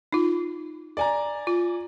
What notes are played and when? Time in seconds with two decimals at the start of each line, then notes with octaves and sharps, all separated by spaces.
0.13 D#4 F4
0.97 D5 G#5 A#5
1.47 F4